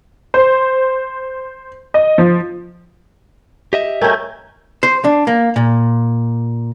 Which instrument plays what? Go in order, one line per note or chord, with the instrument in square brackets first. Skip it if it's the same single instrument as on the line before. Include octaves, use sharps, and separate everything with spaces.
[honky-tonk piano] C5
D#5
F3
[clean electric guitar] G4 D#5 E5
[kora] A3 C#4 [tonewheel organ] A#4 G5 G#5
[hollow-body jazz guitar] C5
D4
A#3
A#2